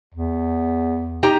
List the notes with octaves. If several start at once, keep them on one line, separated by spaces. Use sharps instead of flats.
E2
D#4 G4 A#5